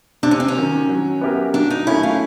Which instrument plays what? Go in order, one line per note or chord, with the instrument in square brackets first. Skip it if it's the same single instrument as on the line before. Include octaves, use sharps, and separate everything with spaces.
[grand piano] C3 [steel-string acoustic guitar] D4
[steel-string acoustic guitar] C#4
C4
C#4
[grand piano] D#3 F#3
F#3
B3 E4 G4 A#4
[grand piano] F#3 [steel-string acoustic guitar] D4
[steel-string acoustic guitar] D#4
[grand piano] A3 C#4 [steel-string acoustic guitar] E4
[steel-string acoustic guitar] F4